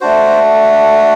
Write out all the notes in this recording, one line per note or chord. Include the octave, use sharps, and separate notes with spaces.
A3 D4 F#4 C5